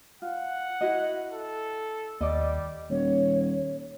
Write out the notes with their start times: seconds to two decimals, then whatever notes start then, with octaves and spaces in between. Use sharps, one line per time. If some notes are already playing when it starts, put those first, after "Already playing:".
0.22 F4 F#5
0.81 E4 F#4 D#5
1.32 A4
2.21 D#2 G3 D5 D#5
2.90 D#1 C#5